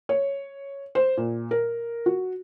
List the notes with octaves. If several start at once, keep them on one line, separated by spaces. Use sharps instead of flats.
C#5
C5
A#2
A#4
F#4